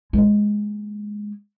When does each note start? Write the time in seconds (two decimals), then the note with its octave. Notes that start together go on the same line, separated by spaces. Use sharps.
0.13 G#3 A#3